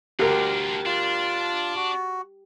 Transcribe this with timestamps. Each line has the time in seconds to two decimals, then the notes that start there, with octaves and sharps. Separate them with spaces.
0.19 D2 D4 F4 G4 A#4
0.86 D4 F4
1.76 F#4